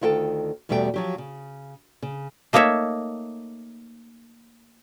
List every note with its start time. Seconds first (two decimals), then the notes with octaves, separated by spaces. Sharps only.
0.01 D2 D#3 E4 F4 A4 G5
0.69 E2 B2 G3 A3 F#4 G5
0.94 F3 F#3 G4
1.18 C#3
2.02 C#3
2.53 A3 A#3 D#4 C#5 E5